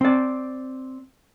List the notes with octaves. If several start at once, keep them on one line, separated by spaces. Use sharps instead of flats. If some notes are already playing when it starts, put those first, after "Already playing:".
C4 D5